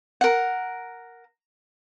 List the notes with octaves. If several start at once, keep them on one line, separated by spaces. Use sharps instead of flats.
A#4 F#5